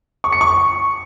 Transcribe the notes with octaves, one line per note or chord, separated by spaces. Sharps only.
C#6
C#7
C#6